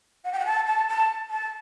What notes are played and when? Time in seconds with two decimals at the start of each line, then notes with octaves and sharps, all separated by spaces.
0.25 F#5
0.33 G5
0.39 F#5
0.46 A5
0.67 A5
0.89 A5
1.30 A5